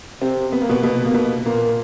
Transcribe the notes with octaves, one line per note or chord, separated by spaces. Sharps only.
C3 C4
B3
A#3
B2 B3
B2 B3
A#3
B2 B3
A#2 A#3